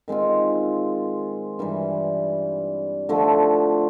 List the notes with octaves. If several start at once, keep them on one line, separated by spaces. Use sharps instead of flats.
D#3 G#3 C4 F4
G2 E3 G3
D3 F3 A3